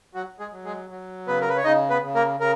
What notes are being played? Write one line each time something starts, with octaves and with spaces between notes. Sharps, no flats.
F#3 F#4
G#3 G#4
F#3
G#3 G#4
F#3
C#3 B3 B4
A#4
B4
C#5
C#3 D#4 D#5
B3 B4
C#3
A#3 A#4
C#3 A#4